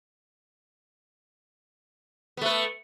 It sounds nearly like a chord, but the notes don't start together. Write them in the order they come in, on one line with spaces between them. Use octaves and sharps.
B3 A3 B4